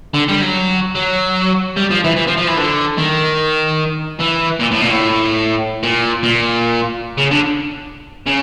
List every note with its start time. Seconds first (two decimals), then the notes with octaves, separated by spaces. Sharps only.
0.14 D3
0.28 G3
0.41 F#3
0.95 F#3
1.76 G3
1.90 F3
2.04 E3
2.17 E3
2.28 F3
2.38 F3
2.48 E3
2.57 D3
2.98 D#3
4.20 E3
4.60 A#2
4.71 A2
4.81 A#2
4.90 A2
5.83 A#2
6.23 A#2
7.18 C#3
7.31 D3
8.26 C#3